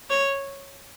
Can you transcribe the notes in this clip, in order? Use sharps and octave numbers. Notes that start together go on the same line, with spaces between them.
C#5